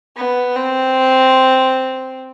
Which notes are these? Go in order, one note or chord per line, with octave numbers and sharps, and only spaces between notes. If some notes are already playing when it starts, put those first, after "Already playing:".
B3
C4